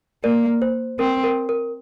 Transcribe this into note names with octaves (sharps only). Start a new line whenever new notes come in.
A#3 A#4 D5
C5
C4 A#4
A#4
A#4